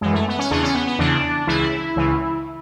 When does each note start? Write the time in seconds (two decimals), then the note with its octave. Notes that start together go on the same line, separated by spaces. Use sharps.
0.01 F#2 E3 G#3
0.13 A3
0.28 B3
0.39 C#4
0.51 E2 C#3 E3 D4
0.63 C#4
0.75 B3
0.87 B3
0.99 E2 C#3 E3 D4
1.47 C#2 C#3 E3 E4
1.96 C#2 C#3 E3